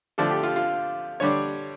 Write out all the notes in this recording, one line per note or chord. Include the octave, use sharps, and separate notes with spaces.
D3 F3 A3 D4 A4
G4
F4
F4
D3 G3 D4 C#5